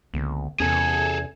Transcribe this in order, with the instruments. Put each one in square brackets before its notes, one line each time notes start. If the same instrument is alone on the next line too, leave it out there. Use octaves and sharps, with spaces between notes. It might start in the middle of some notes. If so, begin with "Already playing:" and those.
[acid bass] C#2 [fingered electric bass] D3 A#3 B3
[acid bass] E2 [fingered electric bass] C3 B3 C#4 [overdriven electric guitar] G#4 A4 [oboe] G#5